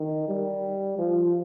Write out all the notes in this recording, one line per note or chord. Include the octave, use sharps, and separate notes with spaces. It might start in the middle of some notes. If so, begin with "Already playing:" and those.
Already playing: D#3
G3
F3